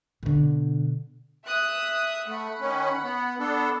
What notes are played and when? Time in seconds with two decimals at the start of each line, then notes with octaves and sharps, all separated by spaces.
0.23 B2 D3
1.45 E5 D#6 F#6
2.27 A3 F#5 B5
2.60 D#3 C#4
3.03 B3
3.39 B3 D4 A4